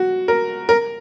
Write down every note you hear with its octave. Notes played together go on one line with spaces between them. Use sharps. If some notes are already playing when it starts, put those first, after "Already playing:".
Already playing: F#4
A#4
A#4